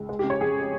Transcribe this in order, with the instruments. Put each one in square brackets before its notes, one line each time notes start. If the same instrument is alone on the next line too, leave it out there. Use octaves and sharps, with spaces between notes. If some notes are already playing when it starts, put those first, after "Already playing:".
Already playing: [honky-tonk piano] C#2
G#3
C#3 G4
C#5
F2 G#4